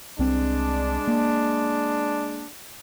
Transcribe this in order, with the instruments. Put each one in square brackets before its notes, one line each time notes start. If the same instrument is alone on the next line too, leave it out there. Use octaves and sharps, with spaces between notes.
[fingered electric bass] C2 C4 [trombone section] G#3 D4
[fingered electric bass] A#3